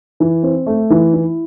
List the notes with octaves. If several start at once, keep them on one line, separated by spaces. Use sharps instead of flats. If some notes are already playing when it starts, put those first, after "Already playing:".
E3
C4
A3
E3
E4